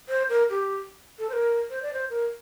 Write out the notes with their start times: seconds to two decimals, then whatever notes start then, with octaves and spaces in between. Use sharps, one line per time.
0.09 C5
0.29 A#4
0.50 G4
1.19 A4
1.29 C5
1.33 A#4
1.70 C5
1.82 D5
1.93 C5
2.10 A#4